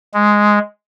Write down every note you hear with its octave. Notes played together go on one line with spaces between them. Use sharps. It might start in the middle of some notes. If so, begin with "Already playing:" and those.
G#3